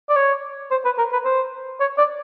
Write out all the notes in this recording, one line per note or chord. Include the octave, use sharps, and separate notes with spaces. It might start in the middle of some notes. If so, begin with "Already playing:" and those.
D5
C#5
C5
B4
A#4
B4
C5
C#5
D5